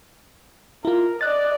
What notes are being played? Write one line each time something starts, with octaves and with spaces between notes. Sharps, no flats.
E4 F4 A#4
D5 D#5 F#6 A6